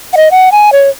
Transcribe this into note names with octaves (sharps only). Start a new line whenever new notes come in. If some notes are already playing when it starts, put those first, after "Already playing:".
F#5
D#5
F#5
G#5
C#5